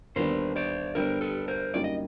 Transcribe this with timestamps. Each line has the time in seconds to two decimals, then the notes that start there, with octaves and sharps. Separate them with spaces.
0.16 D#2 D3 G3 B3 D4 A#4 C5
0.56 C5 D5
0.95 G2 D3 G3 B3 A#4 C5
1.21 A4 B4
1.48 A#4 C5
1.74 F#2 D3 G3 A#3 D#4 D5
1.84 D#5